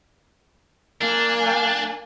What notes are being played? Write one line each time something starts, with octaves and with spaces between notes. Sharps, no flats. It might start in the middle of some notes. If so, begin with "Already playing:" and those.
A#3 D4 G#5